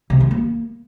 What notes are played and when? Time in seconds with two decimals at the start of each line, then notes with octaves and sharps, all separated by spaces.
0.10 C3
0.20 D#3
0.31 A#3